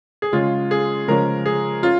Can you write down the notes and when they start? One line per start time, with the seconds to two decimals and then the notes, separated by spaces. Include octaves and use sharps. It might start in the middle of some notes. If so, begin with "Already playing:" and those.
0.22 G#4
0.32 C#3 G#3 C#4 F4
0.71 G#4
1.08 C#3 F3 G#3 C#4 A#4
1.46 G#4
1.83 C#4 F4